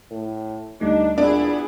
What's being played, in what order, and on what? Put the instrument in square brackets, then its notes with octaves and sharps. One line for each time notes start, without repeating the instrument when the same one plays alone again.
[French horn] A2
[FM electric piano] D2 G3 A3 [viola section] D4 [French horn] D#4
[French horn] A#2 [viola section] B3 E4 G#4 [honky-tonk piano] D4